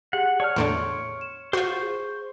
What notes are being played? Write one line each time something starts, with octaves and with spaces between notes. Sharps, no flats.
G4 G#4 F#5
C#5 D5 A5 F6
E2 A2 D3 C6 C#6 D7
E7
F4 F#4 C5 C#6
G#4